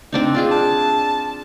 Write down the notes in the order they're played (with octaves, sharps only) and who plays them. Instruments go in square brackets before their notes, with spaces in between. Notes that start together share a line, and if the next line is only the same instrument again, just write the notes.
[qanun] C4 D4 D#4
D4 F4 G#4
[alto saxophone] A5